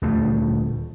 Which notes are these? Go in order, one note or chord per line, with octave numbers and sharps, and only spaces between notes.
D#1 D2 A3